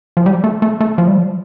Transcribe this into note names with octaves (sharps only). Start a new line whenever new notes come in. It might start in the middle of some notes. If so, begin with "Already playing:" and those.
F3
G3
A3
A3
A3
F3
G3
F3